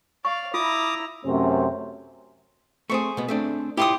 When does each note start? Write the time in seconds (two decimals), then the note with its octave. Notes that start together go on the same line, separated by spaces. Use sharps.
0.25 D5 F5 C#6
0.54 E4 F4 A#5 D6 D#6
1.25 F#2 C3 A3 C#4 C5
2.90 A3 C4 G#4 C5 C#6
3.17 B2 B3
3.28 A3 C4 D4
3.77 E4 F4 G4 C#5 C6 D#6